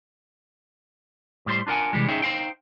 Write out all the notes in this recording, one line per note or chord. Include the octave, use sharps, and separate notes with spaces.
A2 G3 C5 C6
D4 F4 A#4 F#5 G#5
C3 E3 G3 G#3
C#4 D#4 G#4 C#5 E5 G5
D#4 C5 F5 G5